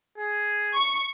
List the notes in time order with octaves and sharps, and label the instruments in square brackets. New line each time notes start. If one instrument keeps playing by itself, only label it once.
[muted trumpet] G#4
[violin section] C#6